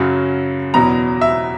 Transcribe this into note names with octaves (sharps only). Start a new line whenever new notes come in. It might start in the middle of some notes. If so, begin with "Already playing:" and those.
Already playing: F#2 C#3 F#3
E2 B2 F#3 A#5
E5